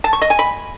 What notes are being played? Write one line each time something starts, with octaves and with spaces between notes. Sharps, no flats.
A5
C#6
D#5
G#5
B5